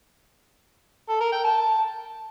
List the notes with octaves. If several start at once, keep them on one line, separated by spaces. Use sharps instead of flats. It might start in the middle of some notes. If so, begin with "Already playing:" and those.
A4
A#4
G5
A5